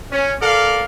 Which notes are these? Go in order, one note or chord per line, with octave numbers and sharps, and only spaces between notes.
C#4
A4 A#4 D5 F5